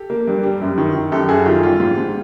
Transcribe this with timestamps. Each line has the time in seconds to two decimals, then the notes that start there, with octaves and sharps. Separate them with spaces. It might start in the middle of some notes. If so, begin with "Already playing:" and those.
Already playing: G4 A4
0.10 A#3
0.27 G2
0.43 G3
0.61 F#2
0.78 D#3
0.95 D#3
1.12 F#2 G4 A4
1.29 F#2 F#4 G#4
1.46 D#3 F4 G4
1.63 G3 F4
1.80 G#2 F4
1.98 G#2